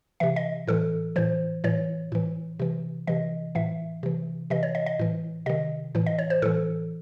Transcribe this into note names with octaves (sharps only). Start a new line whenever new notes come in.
C3 E3 E5
D#5
A2 E3 A4
A2 E3 C5
A2 E3 C#5
A2 E3
C3 E3
C3 E3 D#5
A2 E3 E5
C3 E3
C3 E3 D#5
C#5
D#5
D#5
A2 E3
C3 D#3 D#5
A2 E3
D#5
C#5
C5
A2 E3 A4